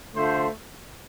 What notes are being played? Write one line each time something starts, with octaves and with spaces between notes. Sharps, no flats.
D3 A3 F4 C5